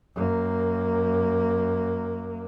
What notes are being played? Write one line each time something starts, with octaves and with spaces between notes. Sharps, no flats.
F#2 A#3